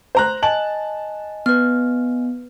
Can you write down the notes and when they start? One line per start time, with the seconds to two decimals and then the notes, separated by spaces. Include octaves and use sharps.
0.15 C5 A#5 F#6
0.43 D#5 G#5 A5 F#7
1.46 B3 B4 F6